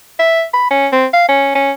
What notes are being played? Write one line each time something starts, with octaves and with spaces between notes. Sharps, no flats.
E5
B5
C#4
C4
F5
C#4
C#4